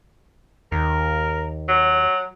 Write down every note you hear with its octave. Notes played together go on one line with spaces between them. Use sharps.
D#2 A#4
F#3